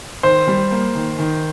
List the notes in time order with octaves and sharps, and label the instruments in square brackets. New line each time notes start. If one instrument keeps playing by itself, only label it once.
[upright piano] D#3 [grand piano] C5
[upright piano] G3
A#3
D#3
D#3